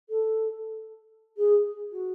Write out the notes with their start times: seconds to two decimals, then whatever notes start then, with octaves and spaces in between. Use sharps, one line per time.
0.09 A4
1.37 G#4
1.92 F#4